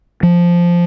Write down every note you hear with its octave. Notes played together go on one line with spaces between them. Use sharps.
F3